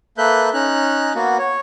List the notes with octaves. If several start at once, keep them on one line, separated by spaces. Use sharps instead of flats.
A#3 A4 B4 E5 F#6 G6
C#4 D#4 F#6
A#3 B3 F#4
C#5